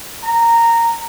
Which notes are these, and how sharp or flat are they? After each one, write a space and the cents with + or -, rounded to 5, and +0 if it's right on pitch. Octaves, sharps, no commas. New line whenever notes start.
A#5 -10